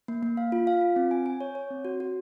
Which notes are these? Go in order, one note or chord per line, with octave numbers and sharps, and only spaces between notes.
A#3
A#3
F5
F4
F5
F4
C4
G#5
G#5
C#5
C#5
C4
F#4
F#4